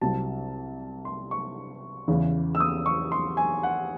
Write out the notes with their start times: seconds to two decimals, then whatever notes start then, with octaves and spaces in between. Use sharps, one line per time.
0.01 C2 C3 F#3 A5
1.05 C6
1.31 C#6
2.08 E2 C#3 E3
2.55 E6
2.60 D#6
2.86 C#6
3.12 C6
3.37 G#5
3.63 F#5